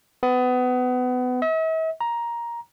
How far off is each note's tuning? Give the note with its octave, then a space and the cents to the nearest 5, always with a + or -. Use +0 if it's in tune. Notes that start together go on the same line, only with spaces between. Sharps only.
B3 +25
E5 -45
A#5 +10